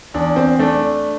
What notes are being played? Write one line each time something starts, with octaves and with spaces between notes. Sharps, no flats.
E2 D4
C4
A3 D4